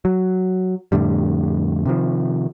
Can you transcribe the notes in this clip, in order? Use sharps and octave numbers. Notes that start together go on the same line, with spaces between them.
F#3
F2 A2 D3 G3
C3 D#3 F3